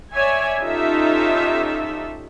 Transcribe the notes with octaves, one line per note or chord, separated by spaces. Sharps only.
C#5 D5 E5 G#5
C#4 D#4 F4 G4 A4 E5